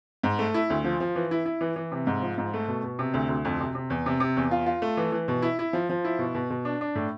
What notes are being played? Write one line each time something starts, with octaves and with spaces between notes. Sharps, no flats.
G#2
A3
E4
D2
F3
F3
E3
E4
E4
E3
E3
C3
G#2
F3
G#2
A3
B2
B2
C3
D2
D2
F2
C3
C3
E2
C3
C3
E2
F4
F4
A3
E3
E3
B2
E4
E4
F3
F3
E4
B2
B2
B2
D4
D4
A2